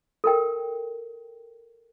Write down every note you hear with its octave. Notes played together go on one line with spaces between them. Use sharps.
A4 A#4 G5